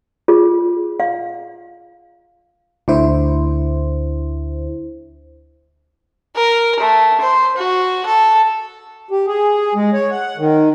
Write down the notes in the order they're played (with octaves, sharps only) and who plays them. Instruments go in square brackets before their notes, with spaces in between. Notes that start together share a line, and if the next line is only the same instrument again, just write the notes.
[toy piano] F4 G#4
F5
[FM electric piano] D2 D3 E4 C5
[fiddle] A#4
A3
C5
F#4
A4
[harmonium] G4
G#4
G#3
C#5
F#5
D#3